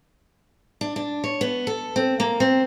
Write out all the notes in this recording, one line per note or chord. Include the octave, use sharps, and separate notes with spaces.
D4
D4
C#5
B3
A4
C4
A#3
C4